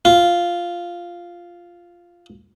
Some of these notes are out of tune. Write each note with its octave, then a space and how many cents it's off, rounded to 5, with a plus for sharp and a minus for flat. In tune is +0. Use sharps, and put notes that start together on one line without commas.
F4 -5